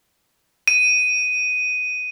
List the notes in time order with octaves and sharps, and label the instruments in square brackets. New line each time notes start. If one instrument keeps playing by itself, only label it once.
[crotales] D#7